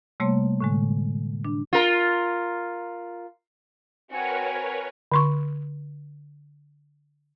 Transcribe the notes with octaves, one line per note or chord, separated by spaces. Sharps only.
C3 G3 A3 A#3 C#5 C6
A2 D3 G#3
D4
F4 A#4
C4 F#4 A#4 B4 C#5 F#5 G#5
D3 C6 C#6